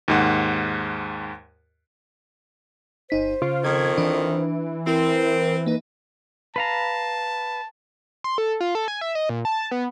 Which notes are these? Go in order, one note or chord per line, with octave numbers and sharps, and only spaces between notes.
D#2 G#2 F#5
G1 D#4 C5 B6
C#3 F4
F2 D#3 G#6
E3 D4
C4 E4 A#4
A#3 D#4 B4
B4 F5 A5 A#5
C6
A4
F4
A4
G#5
E5
D#5
A#2
A5
B3